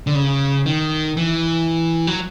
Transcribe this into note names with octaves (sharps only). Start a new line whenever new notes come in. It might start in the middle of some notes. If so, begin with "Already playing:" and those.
D3
C#3
D#3
E3
F#3